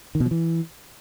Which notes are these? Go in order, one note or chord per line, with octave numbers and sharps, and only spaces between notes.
D#3
B2
F3
E3